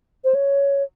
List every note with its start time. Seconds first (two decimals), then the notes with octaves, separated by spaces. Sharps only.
0.24 C5
0.34 C#5